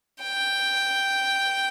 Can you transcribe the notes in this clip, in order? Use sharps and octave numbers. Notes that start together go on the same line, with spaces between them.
G5